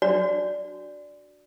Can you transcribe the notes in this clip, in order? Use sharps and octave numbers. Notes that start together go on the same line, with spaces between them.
D4 F#4 D5